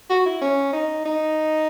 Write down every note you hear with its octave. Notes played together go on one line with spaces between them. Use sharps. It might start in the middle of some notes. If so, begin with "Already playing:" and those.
F#4
E4
C#4
D#4
D#4